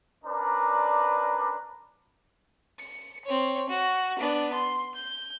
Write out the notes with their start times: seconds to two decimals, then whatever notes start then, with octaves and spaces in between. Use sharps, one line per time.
0.24 C#4 D4 A#4 B4 D5 A#5
2.80 C#7
3.26 C4 C#5
3.70 F#4
4.19 B3 D4
4.54 C6
4.95 G6